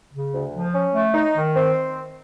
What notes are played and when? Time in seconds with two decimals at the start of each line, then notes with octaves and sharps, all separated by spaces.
0.12 C#3
0.33 D2
0.53 F3
0.73 C#4
0.93 A3
1.14 D#4
1.35 D#3
1.55 C4